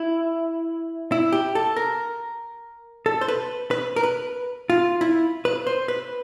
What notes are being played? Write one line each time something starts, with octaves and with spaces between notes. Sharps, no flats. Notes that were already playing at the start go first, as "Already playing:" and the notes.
Already playing: E4
E4
G4
A4
A#4
A4
C5
B4
B4
A#4
B4
F4
E4
B4
C5
B4